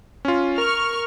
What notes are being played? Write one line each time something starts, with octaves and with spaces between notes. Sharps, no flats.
C#4 F4
A#4 C#6 F6